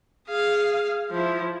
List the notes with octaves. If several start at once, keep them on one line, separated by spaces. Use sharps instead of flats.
G#4 F5
F3 E4